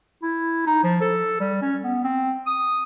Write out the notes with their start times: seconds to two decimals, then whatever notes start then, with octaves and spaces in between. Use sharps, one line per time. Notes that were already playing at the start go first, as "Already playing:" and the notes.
0.23 E4
0.66 D#4
0.84 F3
1.01 A4
1.40 G3
1.62 C#4
1.84 B3
2.04 C4
2.47 D#6